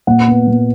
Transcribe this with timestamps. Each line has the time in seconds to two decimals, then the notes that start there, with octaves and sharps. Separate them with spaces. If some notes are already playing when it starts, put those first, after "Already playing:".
0.07 A#2 F#5
0.28 B3
0.47 A#2